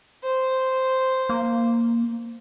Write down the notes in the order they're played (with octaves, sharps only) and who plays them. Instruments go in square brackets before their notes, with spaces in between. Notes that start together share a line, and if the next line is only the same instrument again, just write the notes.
[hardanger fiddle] C5
[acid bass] A#3